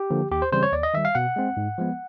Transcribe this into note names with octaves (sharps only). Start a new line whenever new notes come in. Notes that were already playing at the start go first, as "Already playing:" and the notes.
Already playing: G4
D3 F3 A#3
D#2 G4
C5
C#3 E3 G3 C4 C5
C#5
D#2 D5
D#5
D#3 G3 E5
F5
B2 F#5
G#3 C4
G#2
F3 G#3 B3